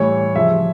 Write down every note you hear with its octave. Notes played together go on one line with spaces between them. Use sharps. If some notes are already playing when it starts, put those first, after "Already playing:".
Already playing: A2 E3 G3 C#5
C#3 F3 E5